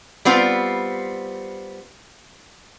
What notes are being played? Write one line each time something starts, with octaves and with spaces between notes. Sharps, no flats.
G3 B3 C4 F4